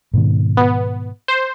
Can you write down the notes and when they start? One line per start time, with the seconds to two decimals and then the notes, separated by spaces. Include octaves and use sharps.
0.14 G#2 B2 D#3
0.57 B3
1.28 C5